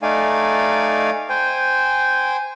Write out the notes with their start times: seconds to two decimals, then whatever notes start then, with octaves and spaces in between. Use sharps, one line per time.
0.02 A3 D#4 D5 F5 G#5
1.29 C5 G5 G#5